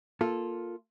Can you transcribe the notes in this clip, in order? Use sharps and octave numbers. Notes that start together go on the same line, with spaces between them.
A#3 F4 A4